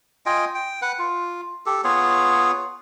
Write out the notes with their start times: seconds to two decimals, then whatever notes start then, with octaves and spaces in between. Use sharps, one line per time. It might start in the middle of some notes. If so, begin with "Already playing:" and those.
0.26 F4 D#5 G5 G#5
0.55 G5
0.82 B4 F#5
0.99 F4
1.66 G4 A4
1.84 B3 F4 G#4 C#5